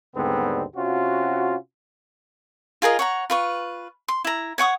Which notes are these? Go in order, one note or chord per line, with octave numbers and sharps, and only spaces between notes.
D#2 G#2 D3 G3 B3 C4
C3 C#4 F4 F#4
F4 G#4 A#4 D#5
C#5 F#5 A#5
F4 B4 C#6
C6
E4 A#5
C#5 F#5 C#6 D#6